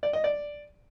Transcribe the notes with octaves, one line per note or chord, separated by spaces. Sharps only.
D5
D#5
D5